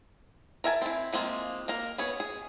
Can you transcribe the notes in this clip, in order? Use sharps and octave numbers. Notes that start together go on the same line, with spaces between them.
A#4 E5 G#5 A5
C4 E4
F3 G#3 A#3 C4
A#3 A#4
B3 G#4 C#5
G#4